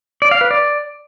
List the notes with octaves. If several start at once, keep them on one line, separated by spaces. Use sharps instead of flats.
D5
F5
B4
D5